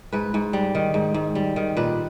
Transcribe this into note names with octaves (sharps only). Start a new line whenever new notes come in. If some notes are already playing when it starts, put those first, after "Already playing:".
G#2 B4
G#2
G3
D#3
G#2
G#2
G3
D#3
A#2 B4